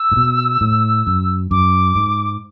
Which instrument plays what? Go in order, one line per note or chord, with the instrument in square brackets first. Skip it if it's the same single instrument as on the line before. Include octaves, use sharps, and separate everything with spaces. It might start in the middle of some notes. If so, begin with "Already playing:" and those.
Already playing: [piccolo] E6
[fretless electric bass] A2
B2
A2
F#2
[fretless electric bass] F#2 [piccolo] D6
[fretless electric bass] G#2